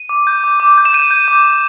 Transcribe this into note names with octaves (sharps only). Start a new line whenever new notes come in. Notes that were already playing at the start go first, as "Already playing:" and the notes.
Already playing: D#7
D6
G6
D6
D6
G6
E7
G6 D#7
G6
D6
G6